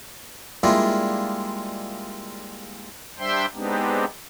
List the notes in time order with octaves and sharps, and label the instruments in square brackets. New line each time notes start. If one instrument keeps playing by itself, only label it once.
[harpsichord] G3 G#3 A#3 D4 E4 F4
[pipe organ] G3 D4 C5 E5 G5 C6
G#3 B3 C4 D4 D#4 G4